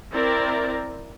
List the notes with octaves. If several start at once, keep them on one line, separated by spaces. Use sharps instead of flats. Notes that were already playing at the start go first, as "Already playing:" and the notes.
C4 E4 A#4 D5